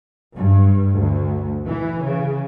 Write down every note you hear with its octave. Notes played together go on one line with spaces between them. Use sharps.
G2
D2
E3
C#3